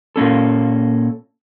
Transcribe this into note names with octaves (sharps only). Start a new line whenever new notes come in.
A#2 A#3 C#4 A4